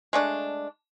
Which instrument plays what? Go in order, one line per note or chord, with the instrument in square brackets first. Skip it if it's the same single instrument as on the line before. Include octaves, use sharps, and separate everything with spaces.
[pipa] G#3 A3 D4